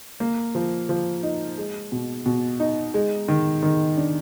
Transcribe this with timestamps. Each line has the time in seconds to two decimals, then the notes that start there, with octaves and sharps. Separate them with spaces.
0.20 A#3
0.55 F3
0.89 F3
1.23 D#4
1.58 G#3
1.92 B2
2.26 B2
2.60 D#4
2.94 G#3
3.28 D#3
3.63 D#3
3.97 D4